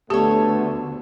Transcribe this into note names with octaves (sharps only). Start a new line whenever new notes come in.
D2 D3 A3 B3 G4 A4 C#5